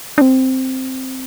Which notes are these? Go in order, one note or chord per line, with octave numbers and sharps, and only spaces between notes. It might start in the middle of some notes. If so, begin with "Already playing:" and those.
D4
C4